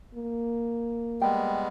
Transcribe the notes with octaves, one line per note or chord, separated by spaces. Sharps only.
A#3
G3 G#3 B3 G5